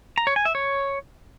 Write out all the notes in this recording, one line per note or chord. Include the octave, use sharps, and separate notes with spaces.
A#5
C#5
G#5
E5
C#5